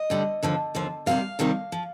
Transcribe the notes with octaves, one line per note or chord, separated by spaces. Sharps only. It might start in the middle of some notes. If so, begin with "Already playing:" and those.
Already playing: D#5
D2 D3 G3
D#2 D3 F3
D#2 D3 F3
D2 C3 D#3 G3 F5
D2 C3 D#3 G3
F3